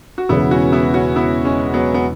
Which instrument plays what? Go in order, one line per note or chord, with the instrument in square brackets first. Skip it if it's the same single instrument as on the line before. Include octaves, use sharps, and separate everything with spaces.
[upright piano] F#4
[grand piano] E1 E2 C#3 [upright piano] B3 E4
[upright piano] C#4 F#4
B3 E4
C#4 F#4
B3 E4
G#3 C#4
F#3 B3
B3